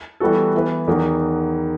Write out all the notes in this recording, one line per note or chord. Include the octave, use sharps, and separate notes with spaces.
E3 G3 B3 F#4 A4
E3 B3 E4 B4
E2 D#3 F#3